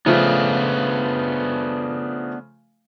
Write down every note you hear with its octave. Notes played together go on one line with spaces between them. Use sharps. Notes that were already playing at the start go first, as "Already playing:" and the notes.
C#3 F3 A3 B3 D4